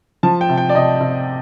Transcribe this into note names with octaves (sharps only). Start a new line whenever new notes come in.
F3 A5
G5
C3
G5
D5
C3 D#5
C3